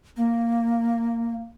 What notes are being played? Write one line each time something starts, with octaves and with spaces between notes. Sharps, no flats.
A#3